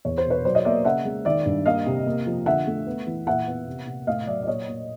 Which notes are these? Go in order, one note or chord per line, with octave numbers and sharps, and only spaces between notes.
E2 C#5
C5
B2
B4 C#5
F#3 C5 D5
C#5 D#5
A#3 D5 E5
C#3 E5 F#5
G#3
D#3 D5 E5
G2
A#3 D#5 F5
C3
A#3
F3
D3 E5 F#5
A3
B3
E3
A#2 E5 F#5
B3
C3
C3
A2 D#5 F5
F#3 D5 E5
D5
A#2 C#5 D#5
A#2